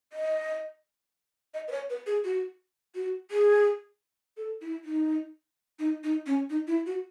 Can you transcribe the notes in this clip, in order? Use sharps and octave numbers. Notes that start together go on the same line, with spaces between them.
D#5
D#5
B4
C#5
B4
G#4
F#4
F#4
G#4
A4
E4
D#4
D#4
D#4
C#4
D#4
E4
F#4